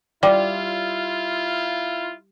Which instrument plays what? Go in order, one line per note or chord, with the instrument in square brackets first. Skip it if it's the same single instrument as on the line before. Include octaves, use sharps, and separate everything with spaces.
[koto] G3 [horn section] E4 F4 [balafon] D5